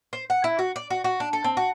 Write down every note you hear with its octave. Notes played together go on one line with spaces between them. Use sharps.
C5
F#5
E4
F#4
D5
F#4
F#4
D4
A4
C4
F#4